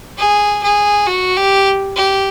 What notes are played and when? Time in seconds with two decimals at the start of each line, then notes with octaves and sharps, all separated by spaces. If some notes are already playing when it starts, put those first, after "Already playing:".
0.17 G#4
0.63 G#4
1.07 F#4
1.37 G4
1.96 G4